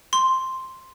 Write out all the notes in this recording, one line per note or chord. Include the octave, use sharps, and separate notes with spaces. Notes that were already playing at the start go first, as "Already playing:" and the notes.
C6